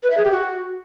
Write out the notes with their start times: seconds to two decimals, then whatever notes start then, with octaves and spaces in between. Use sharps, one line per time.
0.03 B4
0.10 E5
0.17 G#4
0.24 G4
0.31 F#4